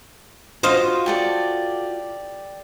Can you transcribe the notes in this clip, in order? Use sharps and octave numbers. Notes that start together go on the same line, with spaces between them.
F4 F#4 C5 D#5 F5
G4 A4 D5